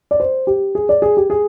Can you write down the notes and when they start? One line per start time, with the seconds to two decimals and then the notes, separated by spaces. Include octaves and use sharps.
0.11 D5
0.20 C5
0.47 G4
0.75 G#4
0.89 D5
1.02 G#4
1.17 G4
1.30 G#4